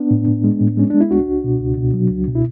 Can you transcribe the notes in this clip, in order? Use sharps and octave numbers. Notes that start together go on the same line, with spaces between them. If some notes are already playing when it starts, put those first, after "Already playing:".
Already playing: B3 D4
A2
A2
G#3
A2
G#3 C#4
G#3 D4
E4
C#2 D4 F#4
C#2
B2
C#2
B2
F#3
C#2
B2
E4